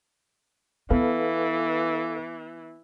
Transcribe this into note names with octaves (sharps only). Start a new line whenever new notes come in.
E3 B3 A4 B4 F5